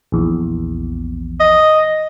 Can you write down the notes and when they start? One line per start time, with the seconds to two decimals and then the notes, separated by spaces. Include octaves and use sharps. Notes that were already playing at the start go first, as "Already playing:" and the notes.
0.12 A#1 E2
1.40 D#5